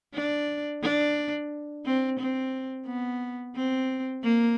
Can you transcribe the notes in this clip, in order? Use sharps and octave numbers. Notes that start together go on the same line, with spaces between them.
D4
D4
C4
C4
B3
C4
A#3